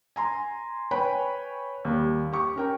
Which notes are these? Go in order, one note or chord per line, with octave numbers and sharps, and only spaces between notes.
G#5 A#5 C6
B4 C#5 G5 G#5 B5
D#2 G3
G4 C#6
C#4 A#4 G5